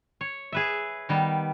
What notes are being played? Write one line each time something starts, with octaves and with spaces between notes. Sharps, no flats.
C#5
G#4 B4 E5
D#3 G3 B3